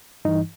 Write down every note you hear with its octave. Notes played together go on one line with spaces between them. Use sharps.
G2 E3 D#4